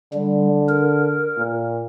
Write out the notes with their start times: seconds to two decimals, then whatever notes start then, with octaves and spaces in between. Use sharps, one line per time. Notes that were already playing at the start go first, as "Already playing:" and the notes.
0.13 D3 G3
0.69 A#4
1.37 A#2